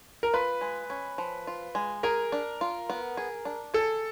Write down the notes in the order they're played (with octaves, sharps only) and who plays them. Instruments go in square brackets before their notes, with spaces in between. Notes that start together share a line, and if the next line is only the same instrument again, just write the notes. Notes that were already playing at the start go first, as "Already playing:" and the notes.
[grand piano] A#4
[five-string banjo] F4 [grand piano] B4
[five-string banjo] G#3
C#4
F3
F4
G#3
[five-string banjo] G#4 [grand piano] A#4
[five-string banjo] D4
F4
B3
G#4
D4
[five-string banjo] G#4 [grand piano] A4